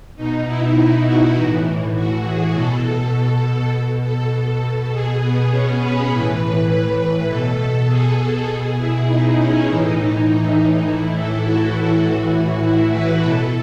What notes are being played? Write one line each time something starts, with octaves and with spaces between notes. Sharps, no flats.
B2 D#4
E4
F#4
A2 E3
F#4
G#4
B2 A4
B2
A4
A4
B2 G#4
B3
C#4
B4
A2 E3 B4
B2 A4
A4
G#4
G#4
B2 G#4
E4
D#4
C#4
A2 E3 D#4
A2 E3 E4
A4
F#4
A2 E3
E4
B4
B2 A4